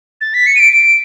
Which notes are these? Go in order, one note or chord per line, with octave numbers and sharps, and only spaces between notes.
A6
B6
C#7
D#7
D7
D7